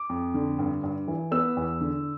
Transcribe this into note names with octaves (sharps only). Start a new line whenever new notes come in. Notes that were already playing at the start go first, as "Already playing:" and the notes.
Already playing: D6
F2
D3
G2
G2
E3
B3 E6
E2
D3